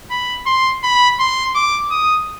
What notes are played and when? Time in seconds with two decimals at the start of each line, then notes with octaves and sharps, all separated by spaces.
0.11 B5
0.47 C6
0.84 B5
1.20 C6
1.55 D6
1.91 D#6